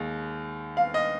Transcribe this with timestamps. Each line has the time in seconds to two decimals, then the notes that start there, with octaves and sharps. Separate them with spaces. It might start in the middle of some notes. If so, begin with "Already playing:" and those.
Already playing: D#2 D#3 G#3
0.77 F5
0.94 D#5